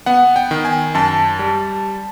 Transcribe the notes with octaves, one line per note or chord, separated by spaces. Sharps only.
B3 F#5
G5
D#3
G#5
F#2 A5
G3